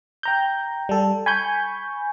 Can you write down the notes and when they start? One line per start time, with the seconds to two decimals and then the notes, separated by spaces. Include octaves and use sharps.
0.23 G5 A#5 G6
0.89 G3 A4
1.26 G#5 B5 C#6 G6